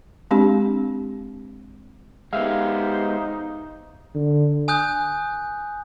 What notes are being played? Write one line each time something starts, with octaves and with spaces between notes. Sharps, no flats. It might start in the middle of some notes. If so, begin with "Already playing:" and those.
G#3 C4 D4 G4
G#3 B3 D#4 G4 C5 E5 F5
D3
G#5 D#6 F#6 G6